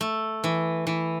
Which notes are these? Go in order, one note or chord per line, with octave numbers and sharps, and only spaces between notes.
A3
E3
E3